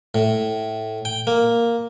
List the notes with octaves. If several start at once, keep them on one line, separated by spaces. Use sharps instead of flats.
A2
G5
A#3